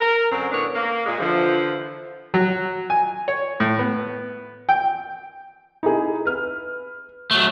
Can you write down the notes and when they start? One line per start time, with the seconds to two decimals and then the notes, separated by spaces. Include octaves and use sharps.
0.01 A#4
0.32 F#2 D3 F#3 C4
0.52 A2 D3 B3 D4 C#5
0.74 A#3
1.06 A#2 G#3
1.20 D3 E3 F3
2.34 F#3
2.90 G#5
3.28 C#5
3.60 A2
3.79 B3
4.69 G5
5.83 D#4 E4 G#4
6.25 B4 F6
7.31 F#3 A3